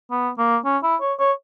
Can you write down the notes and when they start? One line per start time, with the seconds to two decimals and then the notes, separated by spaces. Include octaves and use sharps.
0.11 B3
0.38 A#3
0.65 C#4
0.84 E4
1.01 C#5
1.20 C#5